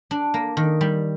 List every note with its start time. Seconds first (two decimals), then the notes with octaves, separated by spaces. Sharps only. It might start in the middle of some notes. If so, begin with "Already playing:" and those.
0.11 D4
0.34 A#3
0.57 D#3
0.81 G3